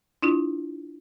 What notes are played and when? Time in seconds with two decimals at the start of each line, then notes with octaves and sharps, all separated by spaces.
0.22 D4 E4 F4